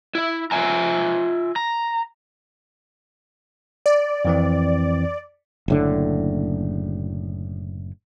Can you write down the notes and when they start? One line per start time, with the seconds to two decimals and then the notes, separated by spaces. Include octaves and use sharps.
0.15 E4 E5
0.51 F4 E5 G#5 A#5
1.56 A#5
3.86 D5
4.25 F2 E3 C4
5.68 F#1 A2 D3